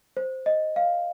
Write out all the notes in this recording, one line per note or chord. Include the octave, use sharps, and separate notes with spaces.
C5
D#5
F5